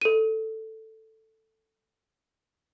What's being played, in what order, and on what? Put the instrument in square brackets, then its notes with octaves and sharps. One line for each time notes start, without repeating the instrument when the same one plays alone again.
[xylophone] A4 D#7